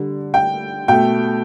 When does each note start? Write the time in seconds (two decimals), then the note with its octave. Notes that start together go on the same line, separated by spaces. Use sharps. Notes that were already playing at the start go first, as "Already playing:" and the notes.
Already playing: D3 G3
0.34 G5
0.88 B2 A3 G5